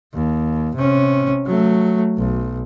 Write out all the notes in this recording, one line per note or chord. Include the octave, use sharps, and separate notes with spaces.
D#2
C3 C#4
F#3 A3
B1